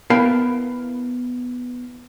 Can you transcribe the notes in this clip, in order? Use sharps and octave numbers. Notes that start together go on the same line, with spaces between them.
B3 E4 A#4 F5 G5 A5